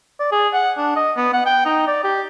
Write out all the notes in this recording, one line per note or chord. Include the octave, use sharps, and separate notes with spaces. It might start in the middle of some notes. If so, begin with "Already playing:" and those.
D5
G#4
F#5
D4
D#5
B3
F#5
G5
D#4
D5
G4